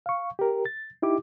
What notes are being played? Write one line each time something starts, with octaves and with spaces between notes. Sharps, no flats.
F5 C#6
G4 A#4
A6
D#4 E4 G4 D6